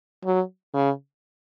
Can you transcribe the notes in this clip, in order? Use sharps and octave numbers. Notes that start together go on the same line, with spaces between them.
F#3
C#3